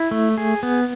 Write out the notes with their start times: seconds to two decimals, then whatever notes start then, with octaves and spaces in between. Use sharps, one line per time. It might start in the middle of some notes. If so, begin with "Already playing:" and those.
Already playing: E4
0.11 A3
0.37 G#4
0.63 B3